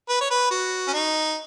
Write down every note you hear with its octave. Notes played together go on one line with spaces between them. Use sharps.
B4
C#5
B4
F#4
C#4
D#4